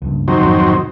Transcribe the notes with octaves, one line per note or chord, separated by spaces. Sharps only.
C#2 G2
D#3 F#3 C4
C2 F2 G#2